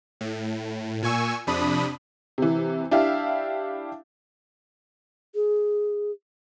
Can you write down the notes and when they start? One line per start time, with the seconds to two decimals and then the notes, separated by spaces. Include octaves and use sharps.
0.21 A2
1.03 A#2 G#5 C#6 E6
1.47 F2 C3 D4 B5 D#6
2.38 C3 E3
2.91 D4 E4 G4 E5 F5
5.35 G#4